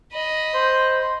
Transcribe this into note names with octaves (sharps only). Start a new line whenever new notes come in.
D#5 B5
C5